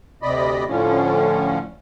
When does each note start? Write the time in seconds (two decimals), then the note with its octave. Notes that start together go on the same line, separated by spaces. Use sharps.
0.22 D2 C3 D5 D#5 B5
0.68 A2 D3 F3 C#4